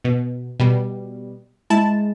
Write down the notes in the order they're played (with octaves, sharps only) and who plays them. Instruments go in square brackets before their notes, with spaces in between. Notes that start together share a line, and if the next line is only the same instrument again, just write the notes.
[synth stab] B2
B2 G3
[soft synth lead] G#3 [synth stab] E4 A5